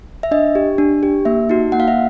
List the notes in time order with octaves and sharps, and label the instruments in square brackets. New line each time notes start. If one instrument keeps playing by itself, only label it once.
[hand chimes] E5
D4 D#5
G4
D4
G4
A#3 E5
D#4 F#4
A#3 F#5
F5
E5